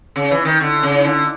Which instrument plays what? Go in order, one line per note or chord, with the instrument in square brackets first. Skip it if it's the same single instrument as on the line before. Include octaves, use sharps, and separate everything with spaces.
[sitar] C#3 [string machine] C#4 D#4
[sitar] E3
D#3
[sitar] D3 [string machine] D4 E4
[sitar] C#3
D3